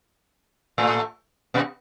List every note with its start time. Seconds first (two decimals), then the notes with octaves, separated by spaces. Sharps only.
0.78 A2 A3
1.54 B2 B3